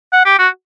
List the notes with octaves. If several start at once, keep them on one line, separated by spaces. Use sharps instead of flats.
F#5
G4
F#4